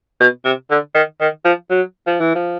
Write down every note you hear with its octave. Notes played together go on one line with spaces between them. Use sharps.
B2
C3
D3
D#3
D#3
F3
F#3
F3
E3
F3